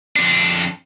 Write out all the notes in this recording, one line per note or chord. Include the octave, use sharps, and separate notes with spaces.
F2 D4